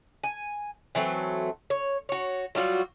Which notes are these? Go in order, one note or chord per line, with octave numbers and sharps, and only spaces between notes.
G#5
E3 F#3 A3 C4
C#5
F#4 C#5
F#3 G3 F4 F#4